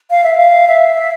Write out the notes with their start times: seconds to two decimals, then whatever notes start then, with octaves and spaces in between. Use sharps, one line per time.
0.10 F5
0.24 E5
0.38 F5
0.68 E5